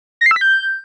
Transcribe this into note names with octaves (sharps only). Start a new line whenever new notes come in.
A#6
C7
E6
B6
G6